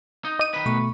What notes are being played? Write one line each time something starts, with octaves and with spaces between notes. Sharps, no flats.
D#4
D#5 D#7
D#3 B4
B2 A3 C#6